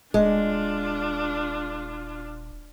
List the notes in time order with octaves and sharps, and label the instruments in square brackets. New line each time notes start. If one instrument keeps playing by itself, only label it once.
[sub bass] D#1 [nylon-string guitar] G#3 [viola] D4 F4